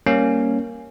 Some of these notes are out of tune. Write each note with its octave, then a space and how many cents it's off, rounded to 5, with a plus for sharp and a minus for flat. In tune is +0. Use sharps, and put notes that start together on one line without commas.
G3 +0 A#3 +0 C#4 +0